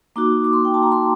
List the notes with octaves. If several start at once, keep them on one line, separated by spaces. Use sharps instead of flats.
A#3 D#4 F#4 D6
D6
C6
G5
A5
A#5
C6